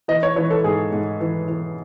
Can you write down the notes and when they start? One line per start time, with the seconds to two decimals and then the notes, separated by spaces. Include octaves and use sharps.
0.08 E3 D#5
0.23 C#5
0.36 E3 C#5
0.51 A4
0.64 G#2 G#4
0.92 G#2
1.21 E3
1.48 E3